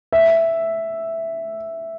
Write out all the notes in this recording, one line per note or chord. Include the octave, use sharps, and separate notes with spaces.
E5